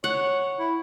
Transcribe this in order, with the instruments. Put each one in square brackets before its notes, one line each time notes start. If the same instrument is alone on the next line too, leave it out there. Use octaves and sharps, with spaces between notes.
[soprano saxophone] C#5 [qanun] F#5
[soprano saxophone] E4